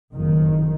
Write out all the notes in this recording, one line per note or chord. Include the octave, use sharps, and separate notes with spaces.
F#1 F2 D#3